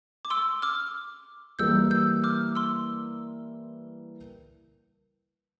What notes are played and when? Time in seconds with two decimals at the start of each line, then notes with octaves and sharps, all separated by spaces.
0.25 D6
0.30 C6 E6
0.62 D6 F6
1.59 E3 G3 A#3 E4 A#4 E6 G6
1.91 E6 G6
2.24 D6 F6
2.55 C6 E6